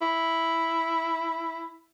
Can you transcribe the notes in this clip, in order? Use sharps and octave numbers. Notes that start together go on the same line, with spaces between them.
E4